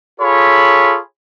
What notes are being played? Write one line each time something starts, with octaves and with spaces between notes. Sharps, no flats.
F4 G#4 A4 C#5 B5